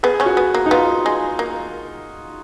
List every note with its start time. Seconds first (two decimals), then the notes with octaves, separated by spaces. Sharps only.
0.03 B3 G#4
0.20 C#3 C#4
0.26 F#4
0.37 B3
0.54 A#3
0.66 D#4
0.71 B3 F4
1.06 G#3
1.39 A#3